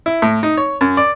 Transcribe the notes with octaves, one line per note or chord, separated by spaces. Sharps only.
E4
A2
D#4
C#5
F#2
D5